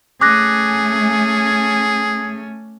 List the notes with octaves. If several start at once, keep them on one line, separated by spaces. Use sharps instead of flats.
A3 C#4 G#4 D6 F#6 A#6